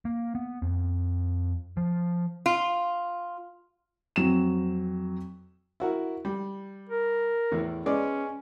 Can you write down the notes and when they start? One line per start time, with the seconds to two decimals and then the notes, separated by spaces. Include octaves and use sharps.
0.05 A#3
0.35 B3
0.62 F2
1.77 F3
2.46 F4
4.16 F2 F#3 C4 E7
5.80 E4 F#4 A#4
6.25 G3
6.89 A#4
7.52 E2 A2
7.86 G#3 B3 C#4 D5